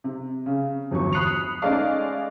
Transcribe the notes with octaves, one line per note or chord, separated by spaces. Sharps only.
C3
C#3
G1 E2 F#3 C#6
B5 D#6 F#6 C7 C#7 F7
G#3 A3 C#4 D#4 D5 F5